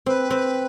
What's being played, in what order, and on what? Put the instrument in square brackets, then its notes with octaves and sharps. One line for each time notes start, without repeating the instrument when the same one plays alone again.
[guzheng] C4 [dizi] B4
[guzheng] C4